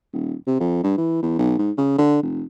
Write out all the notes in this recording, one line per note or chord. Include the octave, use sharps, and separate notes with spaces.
D#1
C3
F2
G2
E3
E2
B1
G#2
C#3
D3
F1